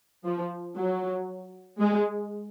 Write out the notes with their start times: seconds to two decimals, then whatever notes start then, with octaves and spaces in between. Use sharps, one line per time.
0.25 F3
0.76 F#3
1.80 G#3